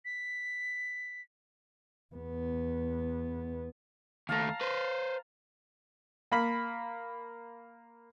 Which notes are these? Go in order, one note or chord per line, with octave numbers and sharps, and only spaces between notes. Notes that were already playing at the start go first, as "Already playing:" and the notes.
B6
E2 B3
D#2 A3 F5 A5 A#5
B4 C5
A#3 B5